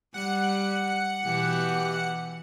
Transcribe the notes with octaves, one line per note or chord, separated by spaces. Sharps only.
G3 F#5 F#6 C#7
B2 E3 G4